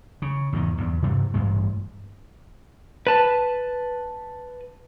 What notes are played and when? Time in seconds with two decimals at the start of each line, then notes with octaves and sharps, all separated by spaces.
0.22 C#3
0.53 E2 G#2 D#3
0.78 E2 G2
1.02 G2 C3 F#3 G3
1.34 A1 G2 G#3
3.07 B4 A5